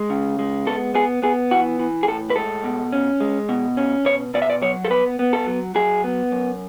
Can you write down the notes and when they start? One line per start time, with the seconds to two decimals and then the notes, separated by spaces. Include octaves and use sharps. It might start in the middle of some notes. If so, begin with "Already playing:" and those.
Already playing: G#3
0.10 C#3
0.39 G#3
0.67 B3 A4
0.94 B3 G#4
1.22 B3 G#4
1.51 E3 F#4
1.79 E3
2.03 G#4
2.08 A2 A4
2.30 B4
2.36 G#3 A4
2.64 B2
2.93 C#4
3.20 G#3
3.49 B2
3.77 C#4
4.05 B2 C#5
4.34 B2 D5
4.42 E5
4.50 D5
4.62 F#3 C#5
4.85 A4
4.90 B3 B4
5.19 B3
5.33 A4
5.46 F#3
5.75 F#3 G#4
6.04 B3
6.32 F#2